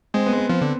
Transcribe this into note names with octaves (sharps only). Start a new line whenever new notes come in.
G#3 C4
B3
B3
F3 C4
D3